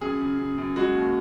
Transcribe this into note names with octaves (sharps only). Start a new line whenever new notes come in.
F#2 G#4
C#3
C#3
F#2
G#3 F#4
D#2